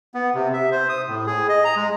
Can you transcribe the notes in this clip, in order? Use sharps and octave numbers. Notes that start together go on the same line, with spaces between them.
B3
C3
E5
C5
D#6
A2
G#4
D#5
A#5
G#3